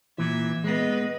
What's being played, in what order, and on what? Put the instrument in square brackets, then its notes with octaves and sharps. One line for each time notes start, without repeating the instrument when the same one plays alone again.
[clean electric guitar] A#2 E3 [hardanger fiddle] E5
[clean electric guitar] G#3 B3 [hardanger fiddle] B4 D#5